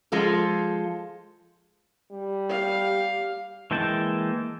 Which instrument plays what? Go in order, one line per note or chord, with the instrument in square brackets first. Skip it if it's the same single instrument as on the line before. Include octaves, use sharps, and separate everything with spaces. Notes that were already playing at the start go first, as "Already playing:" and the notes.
[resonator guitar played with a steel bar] F3 G#3 F4 A4
[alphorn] G3
[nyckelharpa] G4 F5
[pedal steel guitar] E3 G#3 A#3 G5 A5